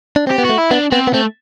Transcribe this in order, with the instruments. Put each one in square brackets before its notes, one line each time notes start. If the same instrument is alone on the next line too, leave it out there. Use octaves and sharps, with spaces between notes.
[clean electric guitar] D4
[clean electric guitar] C4 [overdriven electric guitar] G4
[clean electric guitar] B3
[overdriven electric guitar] F#4
[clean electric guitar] A3
[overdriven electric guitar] E4
[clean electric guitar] B3 [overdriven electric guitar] D4
[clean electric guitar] B3 [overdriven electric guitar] C4
[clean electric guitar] B3
[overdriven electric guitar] A3 [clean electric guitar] C4